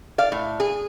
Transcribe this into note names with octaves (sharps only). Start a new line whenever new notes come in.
D5 F5
A2
G#4